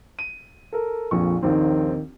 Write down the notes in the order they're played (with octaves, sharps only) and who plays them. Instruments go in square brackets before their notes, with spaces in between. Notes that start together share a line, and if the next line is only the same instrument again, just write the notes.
[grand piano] D#7
A4 A#4
[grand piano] A#1 A#2 C#6 [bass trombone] F2
[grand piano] A#1 D#2 C4 [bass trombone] D#3